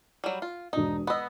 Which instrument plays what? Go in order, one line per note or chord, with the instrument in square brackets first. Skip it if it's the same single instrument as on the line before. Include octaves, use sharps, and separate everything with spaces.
[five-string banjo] F#3 G3
F4
[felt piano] E1 D4 D#6 [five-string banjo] D#4
[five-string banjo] B3 D#5 [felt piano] B5 E6